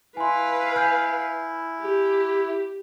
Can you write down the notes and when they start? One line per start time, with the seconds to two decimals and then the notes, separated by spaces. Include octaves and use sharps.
0.17 E4 B4 F5 G#5 C6
0.75 G#5 F6 G6
1.81 G4